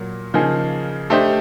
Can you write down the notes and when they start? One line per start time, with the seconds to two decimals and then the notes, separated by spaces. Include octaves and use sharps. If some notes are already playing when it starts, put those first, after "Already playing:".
Already playing: A#2 F#3 A#3
0.34 C#3 F3 A#3 D#4 G#4
1.10 A3 D4 G4 C5 D#5